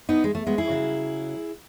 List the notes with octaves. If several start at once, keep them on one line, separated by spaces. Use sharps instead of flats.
B3 D#4
G#3
A3
G#3 B3
E4 G#4
C#3 F#3